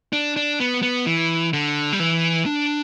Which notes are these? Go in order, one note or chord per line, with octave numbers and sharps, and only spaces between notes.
D4
D4
B3
B3
E3
D3
G3
E3
D4